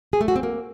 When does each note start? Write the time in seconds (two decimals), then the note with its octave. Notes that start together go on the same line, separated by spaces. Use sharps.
0.13 G#4
0.21 A3
0.28 F#4
0.36 C4
0.43 A#3